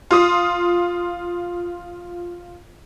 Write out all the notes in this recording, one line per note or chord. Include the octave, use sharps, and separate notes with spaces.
F4 D#6